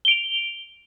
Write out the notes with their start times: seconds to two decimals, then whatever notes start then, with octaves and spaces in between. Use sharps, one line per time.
0.05 G7
0.08 D7
0.11 F7